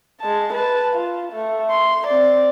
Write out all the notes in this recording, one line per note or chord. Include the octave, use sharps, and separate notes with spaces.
G#3 A5
B4 A5
F4
A3
C6
C4 D5